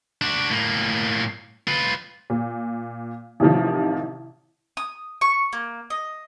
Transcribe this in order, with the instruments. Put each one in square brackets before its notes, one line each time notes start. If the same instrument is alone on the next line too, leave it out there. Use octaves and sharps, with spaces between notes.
[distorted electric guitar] D4 F#4
A2 A#3
F4 B4
[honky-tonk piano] A#2
A1 C3 D#3 F3
[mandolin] D#6
C#6
A#3
D#5